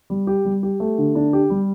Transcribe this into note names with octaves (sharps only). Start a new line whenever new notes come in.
G3
G4
G3
G4
A3
D3
D4
G4
G3